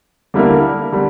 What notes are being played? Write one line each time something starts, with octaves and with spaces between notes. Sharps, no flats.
D3 G3 A#3 E4 A#4
D3 G3